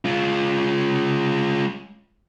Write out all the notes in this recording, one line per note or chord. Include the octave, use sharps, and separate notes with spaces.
G#3 F4